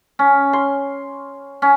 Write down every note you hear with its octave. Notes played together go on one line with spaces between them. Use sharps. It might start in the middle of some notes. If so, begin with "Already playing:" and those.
C#4
C6
C#4